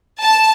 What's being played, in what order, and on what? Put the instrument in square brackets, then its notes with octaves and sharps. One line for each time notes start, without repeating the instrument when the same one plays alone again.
[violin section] A5